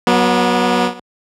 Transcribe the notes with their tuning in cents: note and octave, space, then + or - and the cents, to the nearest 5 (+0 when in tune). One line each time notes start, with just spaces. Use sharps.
F#3 +0 B3 -30